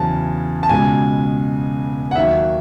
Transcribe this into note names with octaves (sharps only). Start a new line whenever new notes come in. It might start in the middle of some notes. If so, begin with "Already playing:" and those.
Already playing: E2 C#3 F#3 C#4 A5
A5
C#2 B2 G#3 G#5
F#5
D#2 D#3 F#3 E5